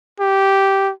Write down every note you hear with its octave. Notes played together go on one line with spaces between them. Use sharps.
G4